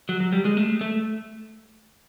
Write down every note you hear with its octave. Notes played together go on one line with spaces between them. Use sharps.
F#3
F#3
G3
G#3
A3
A3